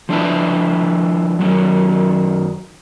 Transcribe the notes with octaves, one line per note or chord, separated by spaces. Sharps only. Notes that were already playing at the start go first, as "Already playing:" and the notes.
F3 D4 E4 B4
F#2 D#3 F#3